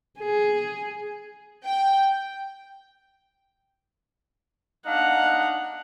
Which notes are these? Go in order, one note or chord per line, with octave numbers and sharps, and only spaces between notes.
G#4
G5
D4 D#4 F5 F#5